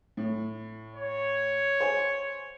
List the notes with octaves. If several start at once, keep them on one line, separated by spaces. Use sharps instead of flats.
A2
C#5
C5 G#5